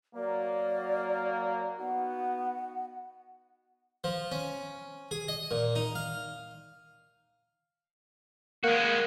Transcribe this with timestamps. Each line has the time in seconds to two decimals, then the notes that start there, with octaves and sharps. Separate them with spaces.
0.15 F#3 A#3 D5
1.80 B3 D#4 F#4 F#5
4.04 F3
4.32 C#4
5.11 G#4
5.28 D#5
5.51 A#2
5.75 D#4
5.95 F5
8.64 G#3 A#3 F#4